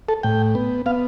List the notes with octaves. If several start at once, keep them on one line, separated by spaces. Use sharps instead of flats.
A4
A2 G5
B3
B3 F5